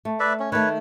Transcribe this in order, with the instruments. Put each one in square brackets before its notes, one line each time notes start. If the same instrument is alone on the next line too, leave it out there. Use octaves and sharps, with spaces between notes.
[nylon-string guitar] A3
[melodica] B4 D5 E5
C#4
[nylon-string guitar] D#3 A3 [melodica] B4 C#5